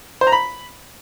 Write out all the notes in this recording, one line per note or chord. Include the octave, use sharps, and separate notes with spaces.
C5
A#5
B5